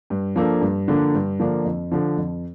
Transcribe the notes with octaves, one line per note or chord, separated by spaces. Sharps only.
G2
F3 A#3 D4 A4
G2
D3 F3 A#3 D4
G2
D3 F3 A#3 D4
F2
D3 F3
F2